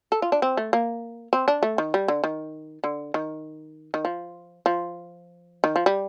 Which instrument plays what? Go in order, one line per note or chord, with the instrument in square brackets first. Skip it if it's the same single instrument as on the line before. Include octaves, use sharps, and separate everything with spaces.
[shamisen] A4
F4
D4
C4
A3
A#3
C4
D4
A3
D#3
G3
D3
D#3
D3
D#3
D#3
F3
F3
D#3
F3
G3